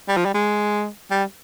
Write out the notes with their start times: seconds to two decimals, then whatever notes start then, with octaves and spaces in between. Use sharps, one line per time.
0.09 G3
0.17 F3
0.25 G3
0.34 G#3
1.11 G3